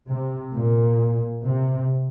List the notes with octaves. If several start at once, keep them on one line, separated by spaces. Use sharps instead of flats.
C3
A#2
C3